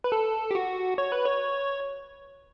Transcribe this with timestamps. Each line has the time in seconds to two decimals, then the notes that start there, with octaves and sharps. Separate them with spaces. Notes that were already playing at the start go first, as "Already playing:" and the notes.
0.04 B4
0.12 A4
0.51 G4
0.55 F#4
0.98 C#5
1.12 B4
1.25 C#5